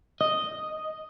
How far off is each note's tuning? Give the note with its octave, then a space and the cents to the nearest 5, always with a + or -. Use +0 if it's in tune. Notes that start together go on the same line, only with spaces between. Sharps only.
D#5 +0